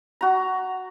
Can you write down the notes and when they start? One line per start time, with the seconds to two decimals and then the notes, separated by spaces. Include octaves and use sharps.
0.21 F#4 A#5